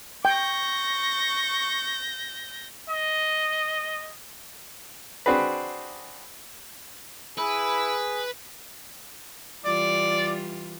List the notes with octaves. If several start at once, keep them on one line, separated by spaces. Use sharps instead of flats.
G5 C#6 G6 A#6
D#5
C4 D4 F#4 G#4 B4
E4 G#4 B4
E3 G3 F4 D5